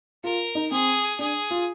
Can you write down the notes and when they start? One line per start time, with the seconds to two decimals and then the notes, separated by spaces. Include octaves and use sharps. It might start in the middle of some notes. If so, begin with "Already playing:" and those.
0.24 F4 A#4
0.55 D#4
0.71 C4 G#4
1.19 D4 G#4
1.51 F4